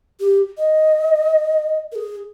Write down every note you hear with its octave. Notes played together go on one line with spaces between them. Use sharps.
G4
D#5
A#4
G#4